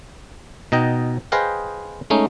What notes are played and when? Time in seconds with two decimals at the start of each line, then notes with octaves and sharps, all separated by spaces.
0.72 B2 D#4 D#5 G5
1.32 G#4 B4 C5 D#5 F5 G5
2.10 G#3 A3 C#4 D#4